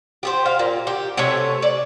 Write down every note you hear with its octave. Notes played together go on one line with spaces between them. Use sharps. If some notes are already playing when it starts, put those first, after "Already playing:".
G4 G#4 C5
F5
A#2
G4
C3 A3 C#5 G#5
D5